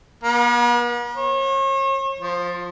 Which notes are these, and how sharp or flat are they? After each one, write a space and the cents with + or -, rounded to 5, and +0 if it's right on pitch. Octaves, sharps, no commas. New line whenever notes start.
B3 -45
C#5 -40
F3 +15